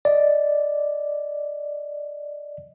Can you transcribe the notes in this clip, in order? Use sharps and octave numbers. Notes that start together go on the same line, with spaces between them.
D5 D#5